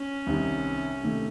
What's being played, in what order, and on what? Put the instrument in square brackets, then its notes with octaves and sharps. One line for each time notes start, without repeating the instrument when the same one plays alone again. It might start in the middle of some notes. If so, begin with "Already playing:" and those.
Already playing: [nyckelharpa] C#4
[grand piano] C2 C3 D#3
C3 D#3 A3